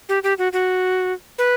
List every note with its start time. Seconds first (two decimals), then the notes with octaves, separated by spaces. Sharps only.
0.09 G4
0.24 G4
0.38 F#4
0.53 F#4
1.38 B4